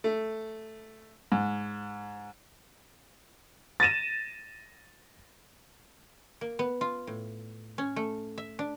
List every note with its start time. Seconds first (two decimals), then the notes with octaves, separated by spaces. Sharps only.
0.04 A3
1.32 G#2
3.80 A6 A#6 D#7 E7
6.41 A#3
6.59 B3
6.81 F4
7.07 A2
7.78 C#4
7.96 A3
8.38 E5
8.59 D4